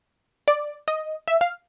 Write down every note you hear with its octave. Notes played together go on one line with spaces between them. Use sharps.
D5
D#5
E5
F5